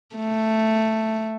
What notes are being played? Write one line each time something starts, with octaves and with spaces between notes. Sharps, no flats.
A3